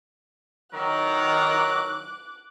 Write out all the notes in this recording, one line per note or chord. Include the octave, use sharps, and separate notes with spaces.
D#3 F#3 A#4 D6 F#6